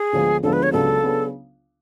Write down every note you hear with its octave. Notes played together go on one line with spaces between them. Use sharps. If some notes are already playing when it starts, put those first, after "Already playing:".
Already playing: G#4
D2 D3 F3 G#3 B3
D2 D3 F3 G#3 B3 A4
B4
C#5
C#2 C#3 F#3 B3 D4 A4
C#3 F#3 B3 D4